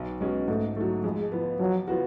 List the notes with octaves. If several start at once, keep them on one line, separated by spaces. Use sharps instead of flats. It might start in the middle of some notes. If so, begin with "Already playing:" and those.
Already playing: B1
B2 G#3 C#4
G#2 A3
F#3 A3
F2 G#3
F3 B3
F2 F#3
F3 B3 F#4